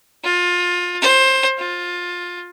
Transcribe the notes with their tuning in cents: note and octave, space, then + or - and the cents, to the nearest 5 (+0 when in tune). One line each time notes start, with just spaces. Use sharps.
F4 +25
C5 +20
F4 +15